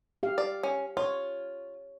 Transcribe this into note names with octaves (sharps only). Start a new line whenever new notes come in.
G4 F5
D5
C#4
F4 C#5